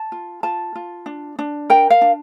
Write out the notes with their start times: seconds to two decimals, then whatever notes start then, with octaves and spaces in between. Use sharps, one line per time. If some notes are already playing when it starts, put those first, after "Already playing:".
Already playing: A5
0.12 F4
0.43 F4 A5
0.76 F4
1.06 D4
1.39 D4
1.70 A#4 G5
1.90 F5
2.01 D4